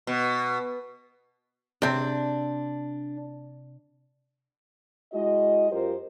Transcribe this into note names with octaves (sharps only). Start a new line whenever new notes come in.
B2
C3 C4 D4
G#3 E4 F#4 D#5
F#2 F4 G4 A#4 C5